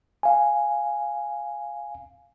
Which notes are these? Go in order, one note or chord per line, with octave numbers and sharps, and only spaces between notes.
F5 G#5